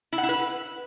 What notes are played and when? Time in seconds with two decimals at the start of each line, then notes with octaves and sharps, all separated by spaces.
0.13 E4
0.18 F#5
0.23 E4
0.29 B4